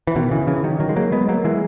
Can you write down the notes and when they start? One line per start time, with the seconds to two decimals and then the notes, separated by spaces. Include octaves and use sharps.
0.07 E3
0.16 B2 D#3
0.31 C#3 E3
0.47 C#3 E3
0.64 D#3 F#3
0.80 D#3 F#3
0.89 G#3
0.96 F#3 A#3
1.12 G#3 B3
1.29 F#3 A#3
1.44 E3 G#3